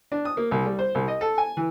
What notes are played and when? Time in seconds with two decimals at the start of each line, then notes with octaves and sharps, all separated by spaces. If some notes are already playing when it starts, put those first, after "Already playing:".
0.12 D4
0.25 D#6
0.37 A#3
0.51 C2
0.66 G3
0.79 C5
0.95 C2
1.08 D#5
1.21 A4
1.38 G#5
1.57 E3